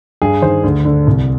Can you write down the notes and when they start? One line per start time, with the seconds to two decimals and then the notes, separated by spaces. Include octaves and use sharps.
0.22 G2 G#4
0.42 D#3 C5
0.64 D2
0.85 D3
1.07 C2